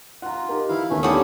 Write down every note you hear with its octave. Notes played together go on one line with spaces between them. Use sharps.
F4 F#5 A#5
D#4 G4 A#4
E3 E4 F5
D#2 A2 A3 B3 C#4
D3 G3 C#4 D#6